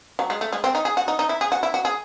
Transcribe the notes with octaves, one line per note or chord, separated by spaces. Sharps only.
F#3
G#3
A3
G#3
C4
D#4
G#4
F#4
D#4
D#4
E4
G#4
F#4
E4
F#4
G#4